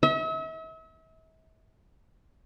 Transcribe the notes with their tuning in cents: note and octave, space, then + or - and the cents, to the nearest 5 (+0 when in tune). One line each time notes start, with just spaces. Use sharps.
E5 -40